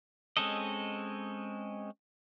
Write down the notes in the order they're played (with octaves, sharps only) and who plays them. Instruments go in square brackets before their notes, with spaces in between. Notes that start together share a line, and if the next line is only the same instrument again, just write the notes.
[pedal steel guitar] G#3 C4 C#4 A4 D#5